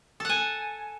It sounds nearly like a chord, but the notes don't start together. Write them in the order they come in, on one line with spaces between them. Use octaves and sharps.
A4 F#5 G#5